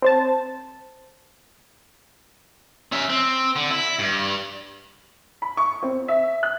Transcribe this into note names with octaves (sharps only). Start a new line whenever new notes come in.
C4 C5 A5
C#4 E5
C4
D3
E4
G2
B5
C#6
C4
E5
F#6